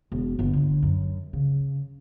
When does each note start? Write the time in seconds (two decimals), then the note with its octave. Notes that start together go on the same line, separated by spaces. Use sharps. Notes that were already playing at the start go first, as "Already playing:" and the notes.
0.12 E1
0.39 G1
0.53 D3
0.83 F#2
1.33 C#3